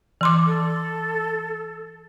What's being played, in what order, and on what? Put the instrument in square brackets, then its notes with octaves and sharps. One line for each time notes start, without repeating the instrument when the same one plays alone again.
[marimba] E3 C6 D6
[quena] A4